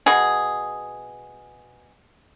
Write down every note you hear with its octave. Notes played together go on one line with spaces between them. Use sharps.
B2 G#4